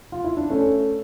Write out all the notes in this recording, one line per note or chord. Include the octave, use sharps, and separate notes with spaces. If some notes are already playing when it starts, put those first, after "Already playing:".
F4
E4
D4
A3 C#4